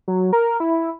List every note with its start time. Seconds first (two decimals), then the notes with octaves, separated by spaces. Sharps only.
0.08 F#3
0.33 A#4
0.60 E4